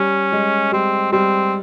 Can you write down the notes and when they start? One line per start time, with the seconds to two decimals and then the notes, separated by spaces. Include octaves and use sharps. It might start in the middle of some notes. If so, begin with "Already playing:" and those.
Already playing: G3 C#4
0.32 G#3
0.72 G3 C4
1.13 G3 C4